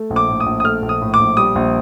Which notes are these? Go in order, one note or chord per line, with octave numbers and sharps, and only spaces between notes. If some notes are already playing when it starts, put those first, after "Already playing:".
Already playing: A3
A#1
D6
A2
D#6
A#1
D#6
A3 F6
A#1
D#6
A2
D6
A#1
G3 D#6
A#1